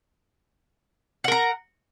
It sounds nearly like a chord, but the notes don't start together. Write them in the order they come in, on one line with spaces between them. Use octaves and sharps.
F#5 A#4 A#5